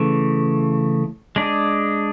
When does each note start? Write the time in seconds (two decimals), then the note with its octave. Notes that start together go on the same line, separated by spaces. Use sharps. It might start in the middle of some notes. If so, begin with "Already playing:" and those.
Already playing: C#3 E3 A3
1.36 G#3 D4 G#4